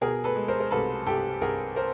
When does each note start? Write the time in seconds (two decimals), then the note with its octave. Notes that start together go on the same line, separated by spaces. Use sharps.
0.01 B2 G#4 A#4
0.24 A4 B4
0.36 G#3
0.48 A#4 C5
0.60 A#4
0.71 C2 A4 B4
1.06 C2 G4 A4
1.41 C2 G#4 A#4
1.76 A#4 C5